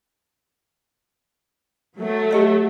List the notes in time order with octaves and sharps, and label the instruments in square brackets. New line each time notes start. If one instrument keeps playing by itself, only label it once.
[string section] F#3 A3
[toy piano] G4 D#5 E5